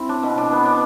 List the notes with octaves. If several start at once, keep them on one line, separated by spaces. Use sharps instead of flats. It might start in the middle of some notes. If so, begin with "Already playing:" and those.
Already playing: C4 E4
D4
B2
D4
B3
D4